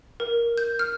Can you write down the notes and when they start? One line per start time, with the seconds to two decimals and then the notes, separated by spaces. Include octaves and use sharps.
0.20 A#4
0.58 G6
0.79 F6